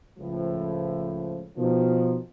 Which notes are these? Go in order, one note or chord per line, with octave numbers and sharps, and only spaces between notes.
C#2 A2 F3
B2 D#3 F3